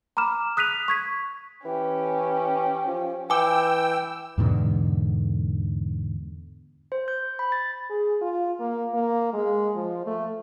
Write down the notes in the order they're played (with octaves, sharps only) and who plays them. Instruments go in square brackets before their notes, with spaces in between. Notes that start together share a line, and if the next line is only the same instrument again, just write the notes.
[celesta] A#5 B5 D6 F6 E7
D#6 F#6 B6 D#7 F7
C#6 G#6 B6
[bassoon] E3 [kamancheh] C#4 G4
[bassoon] F3
[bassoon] E3 [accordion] G5 E6 [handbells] G#5 D6
[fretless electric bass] E2 G#2 B2 D3
[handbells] C5
G6
B5
A6
[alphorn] G#4
F4
A#3
A#3
G#3
F3
A3